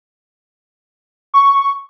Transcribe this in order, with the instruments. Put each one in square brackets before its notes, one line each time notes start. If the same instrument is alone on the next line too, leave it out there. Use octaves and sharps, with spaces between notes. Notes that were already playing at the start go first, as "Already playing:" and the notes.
[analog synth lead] C#6